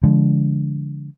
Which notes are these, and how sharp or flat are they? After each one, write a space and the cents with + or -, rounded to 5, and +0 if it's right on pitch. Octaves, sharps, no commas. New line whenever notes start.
D3 -25 F3 -35 G#3 +0